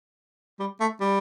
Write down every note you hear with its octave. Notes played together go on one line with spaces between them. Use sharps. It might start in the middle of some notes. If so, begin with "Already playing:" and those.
G3
A3
G3